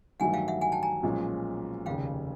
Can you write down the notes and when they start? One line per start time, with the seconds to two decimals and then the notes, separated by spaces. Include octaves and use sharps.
0.20 A1 G2 D#3 F#3 A3 F#5 G#5
0.34 F5 G5
0.48 E5 F#5
0.61 F#5 G#5
0.72 G5 A5
0.83 G#5 A#5
1.03 B1 A#2 F3 G#3 C#4
1.86 F1 D#2 C#3 F5 G5